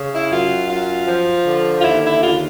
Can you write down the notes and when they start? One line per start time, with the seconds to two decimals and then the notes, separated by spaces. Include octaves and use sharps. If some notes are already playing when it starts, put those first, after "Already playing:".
Already playing: C#3
0.12 E4
0.31 F#2 F4
0.69 F#2 F4
1.08 F3
1.46 D3
1.78 F4
1.83 D#2 E4
2.03 E4
2.21 D#2 F4